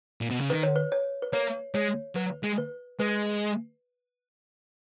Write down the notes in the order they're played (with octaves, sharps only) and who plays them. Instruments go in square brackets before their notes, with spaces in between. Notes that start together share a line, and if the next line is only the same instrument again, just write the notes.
[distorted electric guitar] A#2
B2
C#3
[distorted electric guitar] D#3 [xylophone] B4
[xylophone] C#5
B4
C#5
B4
[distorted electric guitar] A#3 [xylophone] C#5
[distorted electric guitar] G#3 [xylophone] C#5
[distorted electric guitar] F#3 [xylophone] B4
[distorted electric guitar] G#3
[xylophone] B4
[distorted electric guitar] G#3 [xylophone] B4